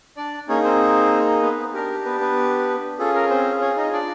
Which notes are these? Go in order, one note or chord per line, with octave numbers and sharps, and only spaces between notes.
D4 D5
A#3 C#4 D#4 G#4 C#5
C4 C5
B3 B4
D4 G4 A#4
B3 B4
B3 B4
C#4 F4 G#4 A4
A#4
C4 C5
C#4 C#5
D#4 D#5
D4 D5